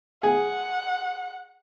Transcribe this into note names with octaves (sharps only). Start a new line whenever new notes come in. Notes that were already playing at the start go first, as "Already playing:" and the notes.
G#4 F#5